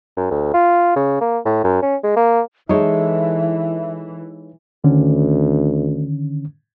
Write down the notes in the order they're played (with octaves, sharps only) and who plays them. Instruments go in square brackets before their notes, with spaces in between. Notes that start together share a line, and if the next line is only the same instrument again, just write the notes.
[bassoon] F#2
D2
F4
C#3
A#3
A2
F#2
C#4
G#3
A#3
[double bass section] E3 [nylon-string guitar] G#3 A4 [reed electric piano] D#4 C#5 [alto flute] E5
[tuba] D2 [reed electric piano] D3 D#3 C#4